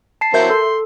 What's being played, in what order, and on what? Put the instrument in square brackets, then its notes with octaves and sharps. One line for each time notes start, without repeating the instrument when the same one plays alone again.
[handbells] A5 C7
[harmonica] F#3 C4 E4 [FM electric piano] A#4 E5 G6
[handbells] A4 [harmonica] C6